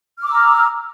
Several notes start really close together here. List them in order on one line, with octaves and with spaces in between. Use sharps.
F6 D6 E6 A#5